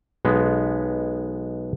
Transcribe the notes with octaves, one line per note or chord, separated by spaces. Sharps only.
B1 G#3 B3